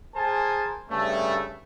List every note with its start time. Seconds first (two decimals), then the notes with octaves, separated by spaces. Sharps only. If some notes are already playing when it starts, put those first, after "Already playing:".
0.15 G#4 A#4 C5 G#5 A5
0.90 G2 C#3 A3